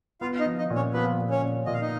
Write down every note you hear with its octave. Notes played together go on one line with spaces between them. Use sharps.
B3 F4 F5
F5
D#4 D#5
F3
D#4 D#5
A#2
C#4 C#5
F3 B3 B4
A#2
C#4 C#5
A#2
A#2 D#5
F5
D#4 D#5